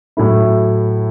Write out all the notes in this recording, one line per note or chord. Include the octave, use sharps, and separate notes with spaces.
A2 F#3 A3 E4